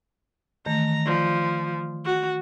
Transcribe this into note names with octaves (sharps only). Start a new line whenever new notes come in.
D#3 E3 A3 A#5
F3 D5
F#4